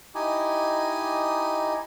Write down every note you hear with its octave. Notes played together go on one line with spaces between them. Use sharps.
D#4 E4 G4 D#5 G#5